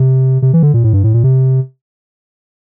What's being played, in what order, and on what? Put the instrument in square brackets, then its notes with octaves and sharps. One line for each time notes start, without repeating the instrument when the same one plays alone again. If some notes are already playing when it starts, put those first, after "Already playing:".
Already playing: [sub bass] C3
C3
E3
D3
A#2
A2
G2
A2
A#2
C3